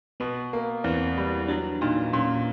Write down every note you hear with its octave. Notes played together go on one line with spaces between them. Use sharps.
B2 B3
A#3
E2 C4
G3
F#3 D4
A#2 D#4
A#2 C#4